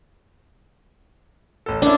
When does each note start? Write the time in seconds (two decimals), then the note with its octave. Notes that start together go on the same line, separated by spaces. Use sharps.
1.66 A1 A4
1.82 A#3 C#4 D4 E4